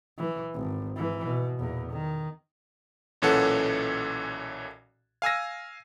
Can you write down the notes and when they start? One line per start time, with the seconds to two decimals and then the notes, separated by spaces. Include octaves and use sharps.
0.18 E3
0.54 G#1
0.96 G#2 E3
1.26 B2
1.59 E2 A#2
1.90 D#3
3.22 B1 A#2 E3 C#4 A4 F#5
5.22 F5 G#5 E6 A#6